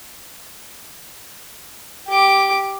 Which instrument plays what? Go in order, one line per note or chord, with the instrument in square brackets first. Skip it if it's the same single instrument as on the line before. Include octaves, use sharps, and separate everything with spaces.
[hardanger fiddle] G4 D6